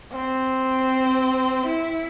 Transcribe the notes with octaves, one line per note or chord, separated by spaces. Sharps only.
C4
E4